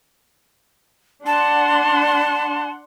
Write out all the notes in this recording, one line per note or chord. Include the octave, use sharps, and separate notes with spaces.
D4 F#5 A5 C6